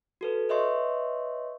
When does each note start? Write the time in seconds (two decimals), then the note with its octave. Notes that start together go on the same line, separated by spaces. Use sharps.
0.21 F#4 A4 B4
0.49 B4 C#5 D#5 E5 C6 C#6